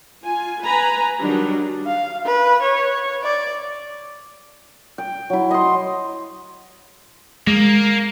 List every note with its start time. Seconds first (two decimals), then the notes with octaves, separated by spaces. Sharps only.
0.23 F4 G#5
0.62 B4 G#5 A#5 B5
1.21 D#3 F#3 G3 D4
1.86 F5
2.25 B4
2.62 C#5
3.23 D5
4.98 G5
5.30 F#3 E4
5.51 D#5 C6
7.47 G#3 A#3